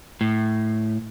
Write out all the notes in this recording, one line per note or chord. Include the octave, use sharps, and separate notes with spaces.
A2